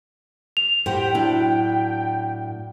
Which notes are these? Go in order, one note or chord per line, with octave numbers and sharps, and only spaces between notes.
F7
A2 G4 C5 F#5 G5
F#3 D4 E4